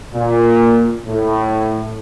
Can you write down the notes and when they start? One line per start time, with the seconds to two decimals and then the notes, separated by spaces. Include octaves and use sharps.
0.14 A#2
1.08 A2